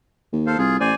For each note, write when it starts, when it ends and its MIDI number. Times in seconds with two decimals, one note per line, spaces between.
0.32 0.55 39
0.47 0.58 69
0.47 0.58 72
0.47 0.58 77
0.58 0.79 36
0.58 0.77 65
0.58 0.77 68
0.80 0.92 33
0.80 0.95 72
0.80 0.95 74
0.80 0.95 80